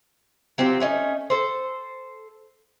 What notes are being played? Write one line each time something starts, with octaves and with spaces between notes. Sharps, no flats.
F#3 C4 F4 G4
A3 C#4 D#4
A4 C5